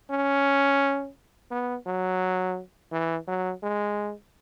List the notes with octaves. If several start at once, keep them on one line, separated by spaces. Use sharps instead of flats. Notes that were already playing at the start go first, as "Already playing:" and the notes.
C#4
B3
F#3
E3
F#3
G#3